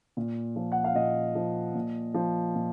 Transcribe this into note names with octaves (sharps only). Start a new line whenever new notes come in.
A#2
F3
F#5
F5
A#2 D#5
F3
A#2
F3
A#2